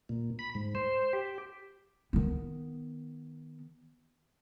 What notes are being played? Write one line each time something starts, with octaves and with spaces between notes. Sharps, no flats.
A#2
B5
G#2
C5
G4
D#3 B3